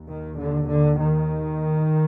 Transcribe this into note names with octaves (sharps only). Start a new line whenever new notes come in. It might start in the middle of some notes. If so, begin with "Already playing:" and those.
Already playing: D#2
D#3
D3
D3
D#3